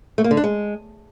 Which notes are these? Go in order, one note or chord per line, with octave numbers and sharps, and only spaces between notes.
A3
A#3
D3
D4
G#3